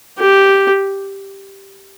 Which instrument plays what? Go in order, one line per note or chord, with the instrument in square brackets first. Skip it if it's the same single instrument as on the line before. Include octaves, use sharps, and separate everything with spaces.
[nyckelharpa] G4